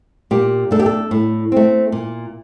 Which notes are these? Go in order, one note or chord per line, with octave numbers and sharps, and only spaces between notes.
A#2 G4
A3 D4 A4
G4
A4
A2
A3 C4
A#2